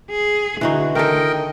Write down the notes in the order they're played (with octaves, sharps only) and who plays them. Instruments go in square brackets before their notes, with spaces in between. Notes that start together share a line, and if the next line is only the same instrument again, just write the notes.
[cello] G#4
[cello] D3 [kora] E3 D#4 F#4
[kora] D#3 A4 [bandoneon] A#4 D#5 G5